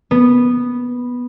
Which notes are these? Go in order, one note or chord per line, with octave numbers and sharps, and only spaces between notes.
B3